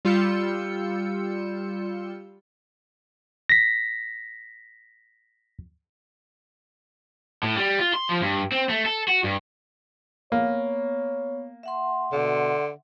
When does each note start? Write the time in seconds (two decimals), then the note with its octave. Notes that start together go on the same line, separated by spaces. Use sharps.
0.05 G3 F4 E6 G6 C#7
3.49 A#6 B6
7.43 A2
7.57 G3
7.79 F4
7.94 C6
8.09 F3
8.22 G2
8.52 C4
8.69 A3
8.86 A4
9.08 F#4
9.24 G2
10.32 A#3 B3 C#5
11.63 E5 F#5 C6
12.12 B2 D3